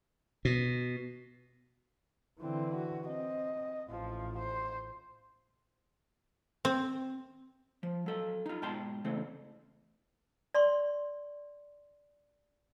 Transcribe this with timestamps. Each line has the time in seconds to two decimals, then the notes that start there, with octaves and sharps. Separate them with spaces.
0.45 B2
2.41 D3 E3 C4
2.75 F#4
3.07 C4 D#5
3.90 A1 F3
4.38 C5
6.65 C4
7.83 F3
8.06 F#3 A4
8.46 D#4 F4
8.62 G#2 B2 G5 A5 C6
9.04 C#3 E3 A3 C4
10.54 D5 C6 C#6